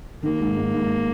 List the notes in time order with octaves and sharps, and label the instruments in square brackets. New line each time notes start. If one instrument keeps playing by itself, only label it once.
[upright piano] D#3 [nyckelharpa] A#3
[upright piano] G#2
G#2
G#2